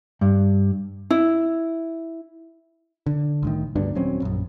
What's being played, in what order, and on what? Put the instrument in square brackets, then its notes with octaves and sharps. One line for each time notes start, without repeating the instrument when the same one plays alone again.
[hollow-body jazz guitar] G2
[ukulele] E4
[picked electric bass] D3
C2 A2 D#3
D2 G2 B3 D4
D#1 F#3 C4 C#4
A#1 F#2